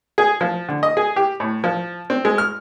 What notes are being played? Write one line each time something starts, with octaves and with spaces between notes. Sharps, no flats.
G#4
F3
D3
D#5
G#4
G4
A2
F3
C4
G#3
F6